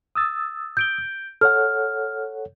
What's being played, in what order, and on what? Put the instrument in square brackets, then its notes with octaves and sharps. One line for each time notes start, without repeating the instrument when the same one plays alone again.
[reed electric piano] D#6 E6 A6
[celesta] G6 D7 G7
[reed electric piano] A4 C#5 F#5 [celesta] F6